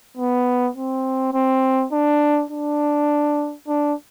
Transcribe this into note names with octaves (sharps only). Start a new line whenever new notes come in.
B3
C4
C4
D4
D4
D4